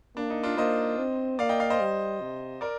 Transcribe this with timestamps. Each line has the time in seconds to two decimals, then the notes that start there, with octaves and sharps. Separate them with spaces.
0.16 A#3 D4
0.30 D#4
0.43 D4 F4
0.57 A#3 C5 D#5
0.98 C4
1.39 A#3 D5 F5
1.49 D#5 G5
1.60 D5 F5
1.70 C5 D#5
1.80 G3
2.21 C3
2.61 A#4 D5